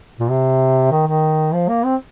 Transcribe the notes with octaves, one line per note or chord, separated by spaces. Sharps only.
A#2
C3
D#3
D#3
F3
A#3
C4